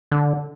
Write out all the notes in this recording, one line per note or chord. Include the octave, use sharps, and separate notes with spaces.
D3